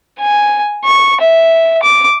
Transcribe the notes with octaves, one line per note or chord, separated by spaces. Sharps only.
G#5
C#6
E5
D6